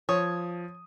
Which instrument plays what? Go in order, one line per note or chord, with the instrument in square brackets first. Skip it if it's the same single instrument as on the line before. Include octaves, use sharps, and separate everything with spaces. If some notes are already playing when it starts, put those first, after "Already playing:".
[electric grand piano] F3 D#6 [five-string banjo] C#5